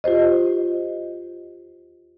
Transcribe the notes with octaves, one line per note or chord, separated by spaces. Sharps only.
F4 G4 C5 D#5